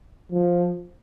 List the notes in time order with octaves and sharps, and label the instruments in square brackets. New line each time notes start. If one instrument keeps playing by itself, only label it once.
[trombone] F3